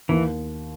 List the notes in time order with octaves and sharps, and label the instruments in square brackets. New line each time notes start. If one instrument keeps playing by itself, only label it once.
[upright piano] D#2 [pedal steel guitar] E3